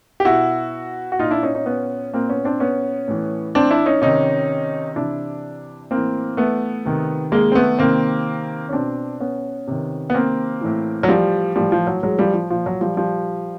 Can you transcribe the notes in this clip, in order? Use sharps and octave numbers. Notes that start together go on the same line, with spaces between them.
G4
B2 E4 F#4
F#4
A#2 D#4 F4
D4 E4
C#4 D#4
C#4 D#4
B3 C#4
A#2 A#3 C4
B3 C#4
C4 D4
B3 C#4
A2 E3
C4 D4
D4 E4
C#4 D#4
C3 D#3 C#4 D#4
C3 E3 D4 E4
A2 E3 A#3 C4
A3 B3
C3 D#3
G#3 A#3
C4
A3 B3
C3 D#3 A#3 C4
C#4
B2 C4 D4
B3 C#4
C3 D#3
B3
A#3 C4
A2 E3
F#3
F3 G3
A2 E3 F3 G3
F3
F#3
F#3 G#3
F3 G3
F3
A#2 F3
F#3
F3 G3
F3 G3